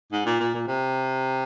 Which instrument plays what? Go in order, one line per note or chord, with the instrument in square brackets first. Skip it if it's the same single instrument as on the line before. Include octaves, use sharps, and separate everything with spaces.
[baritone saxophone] G#2
A#2
A#2
A#2
C3